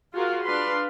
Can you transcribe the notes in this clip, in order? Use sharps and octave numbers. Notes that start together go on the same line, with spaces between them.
F4 F#4 G#4 A#4 F5
D4 B4 F5 B5 C6